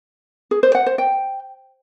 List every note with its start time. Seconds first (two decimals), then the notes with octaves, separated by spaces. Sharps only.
0.51 G#4
0.63 C5
0.75 F#5
0.86 C5
0.98 G5